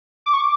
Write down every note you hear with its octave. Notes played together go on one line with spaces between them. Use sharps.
D6
C#6
D6